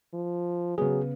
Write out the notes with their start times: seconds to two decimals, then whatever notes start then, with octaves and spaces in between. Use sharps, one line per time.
0.14 F3
0.78 C#3 F#3 B3 G#4